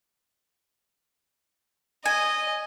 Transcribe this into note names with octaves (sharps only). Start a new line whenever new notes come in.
D#5 G#5